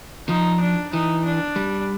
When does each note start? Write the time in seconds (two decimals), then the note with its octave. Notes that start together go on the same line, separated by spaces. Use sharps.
0.28 F3 D#4
0.61 D4
0.93 E3 D#4
1.25 D4
1.56 G3